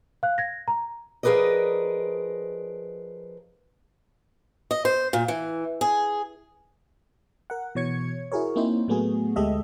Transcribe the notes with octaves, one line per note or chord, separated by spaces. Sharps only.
F5 F#6
G#6 A#6
A#5
F3 G#4 A#4 B4 D5 D#5
D#5
C5
A#2
E3
G#4
A#4 F#5
B2 E3 C#5 G#6 C#7
E4 F#4 G#4 A#4 C#5
A#3 C4 D#4 E4 C5
A2 F#3 A3 B3 F#4 G#4
D2 G#3 G4 A4 D#5 E5